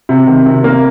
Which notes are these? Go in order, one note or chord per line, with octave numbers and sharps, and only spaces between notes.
C3
D#3
C3
A#3